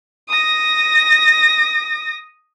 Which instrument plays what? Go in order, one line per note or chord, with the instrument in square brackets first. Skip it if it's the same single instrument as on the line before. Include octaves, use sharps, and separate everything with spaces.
[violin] D#6 A#6